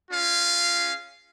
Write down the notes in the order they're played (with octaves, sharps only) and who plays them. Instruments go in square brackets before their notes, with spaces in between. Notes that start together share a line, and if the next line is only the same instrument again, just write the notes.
[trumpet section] C#4 F4 G#4 F5